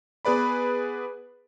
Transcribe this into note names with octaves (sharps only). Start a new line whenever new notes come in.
B3 G#4 B4 D5 B5